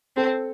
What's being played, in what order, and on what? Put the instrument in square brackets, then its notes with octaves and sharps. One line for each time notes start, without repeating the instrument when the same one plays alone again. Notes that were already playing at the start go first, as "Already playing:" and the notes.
[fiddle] C4 [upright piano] A4